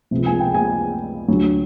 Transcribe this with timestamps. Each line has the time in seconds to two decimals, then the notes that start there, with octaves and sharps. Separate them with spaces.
0.11 C#2 C3 F3
0.26 G#5
0.40 G5
0.54 G#5
1.28 D2 D3 F#3